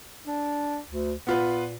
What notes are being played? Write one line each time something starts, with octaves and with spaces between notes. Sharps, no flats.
D4
D2
A#2 B3 F4 B4